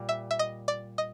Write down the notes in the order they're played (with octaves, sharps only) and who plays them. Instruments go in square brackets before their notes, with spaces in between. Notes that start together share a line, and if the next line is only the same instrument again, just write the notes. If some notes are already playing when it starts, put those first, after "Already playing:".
Already playing: [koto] A#2 G3
[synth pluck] E5
E5
D#5
D5
D#5